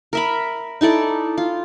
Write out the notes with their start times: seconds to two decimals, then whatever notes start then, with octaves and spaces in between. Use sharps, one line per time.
0.13 A#4 E5 B5
0.81 D#4 E4 A4 D5
1.38 F4